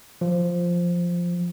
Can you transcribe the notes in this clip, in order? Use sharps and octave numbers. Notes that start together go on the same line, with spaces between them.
F3